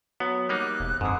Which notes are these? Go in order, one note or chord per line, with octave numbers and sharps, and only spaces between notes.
F#3 B3
G3 A#3 D#4 F#6
E1
F2 G#2 D3 D#6